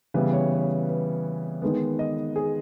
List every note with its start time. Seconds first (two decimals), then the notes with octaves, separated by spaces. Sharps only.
0.14 C#3 E3 G3 B3 B4
0.33 C#5
0.52 C#5
0.89 B4
1.62 D#3 G#3 B3
1.99 D#5
2.36 G#4